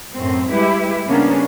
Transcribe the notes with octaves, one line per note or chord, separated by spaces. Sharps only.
F#2 A2 C4
G3 G#3 E4 G4 B4
C#3 G3 A#3 B3 C#4 D4